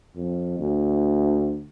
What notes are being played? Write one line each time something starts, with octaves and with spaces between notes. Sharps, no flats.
F2
D2